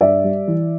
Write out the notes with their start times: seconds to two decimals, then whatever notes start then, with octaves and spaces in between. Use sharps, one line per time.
0.01 G2 D5 E5
0.24 G3
0.47 E3